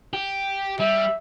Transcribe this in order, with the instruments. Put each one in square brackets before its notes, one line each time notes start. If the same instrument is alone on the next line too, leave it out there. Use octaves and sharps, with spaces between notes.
[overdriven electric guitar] G4
[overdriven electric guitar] G3 [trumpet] E5